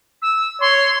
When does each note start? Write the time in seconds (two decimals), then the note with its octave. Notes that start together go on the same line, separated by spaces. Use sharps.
0.22 E6
0.61 C#5 C6